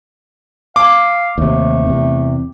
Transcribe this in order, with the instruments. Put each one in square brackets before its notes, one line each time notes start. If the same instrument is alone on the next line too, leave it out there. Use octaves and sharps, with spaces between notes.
[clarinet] F5 [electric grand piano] D6
[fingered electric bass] D#2 C3 [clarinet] A3
[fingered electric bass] E2 C3